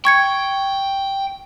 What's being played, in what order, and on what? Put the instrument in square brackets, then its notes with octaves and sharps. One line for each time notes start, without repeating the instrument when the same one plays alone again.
[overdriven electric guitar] G5 [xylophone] C#6 G#6 C#7